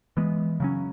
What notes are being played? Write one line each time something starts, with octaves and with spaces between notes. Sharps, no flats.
E3 G#3 B3
C#3 F#3 C#4